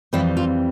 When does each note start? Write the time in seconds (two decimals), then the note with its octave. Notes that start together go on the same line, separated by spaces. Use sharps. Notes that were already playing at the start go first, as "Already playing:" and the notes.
0.13 F2 E3 G3 C4 E4
0.37 F4